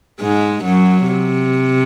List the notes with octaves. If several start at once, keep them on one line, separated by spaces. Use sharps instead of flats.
G#2 G#3
F#2 F#3
C3